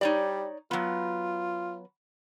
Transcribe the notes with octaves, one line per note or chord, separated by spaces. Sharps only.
G3 D#4 C#5 D5
F#3 B3 F4